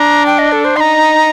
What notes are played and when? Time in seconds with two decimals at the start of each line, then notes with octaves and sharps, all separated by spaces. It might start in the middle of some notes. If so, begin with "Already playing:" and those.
Already playing: D4 A#5
0.26 G5
0.39 D#5
0.52 A4
0.65 C5
0.76 D#4 A#5 C6